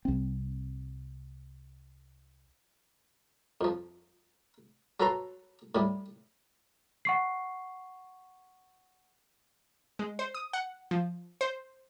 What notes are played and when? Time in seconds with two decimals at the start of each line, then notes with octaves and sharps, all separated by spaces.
0.05 C2 C4
3.61 F2 F3
5.00 F#3 A4 B4 A#5 C6
5.75 A2 G3
7.05 F#5 C#6 C7
9.99 G#3
10.19 C5
10.34 D#6
10.53 F#5
10.91 F3
11.41 C5